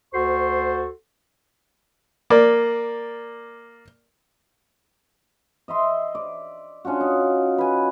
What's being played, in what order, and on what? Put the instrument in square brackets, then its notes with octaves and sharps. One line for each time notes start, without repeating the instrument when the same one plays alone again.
[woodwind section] D2 F#4 A4 C5 C6 C#6
[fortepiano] A#3 D5
[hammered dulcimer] D#5 E5 C6
D5
C#4 D4 F4 F#4
D#4
B4 G#5